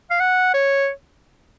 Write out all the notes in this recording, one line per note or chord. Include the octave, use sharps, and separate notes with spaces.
F5
F#5
C#5